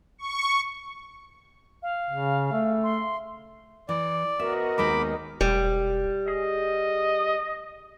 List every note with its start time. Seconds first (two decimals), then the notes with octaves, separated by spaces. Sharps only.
0.18 C#6
1.83 F5
2.10 C#3
2.52 A3
2.84 C6
3.89 E3 D5
4.40 B3 F#4 A#4 D#5 E5
4.78 D#2 G#3 D#4 B5 D6
5.41 E1 G3
6.28 G#4 D#5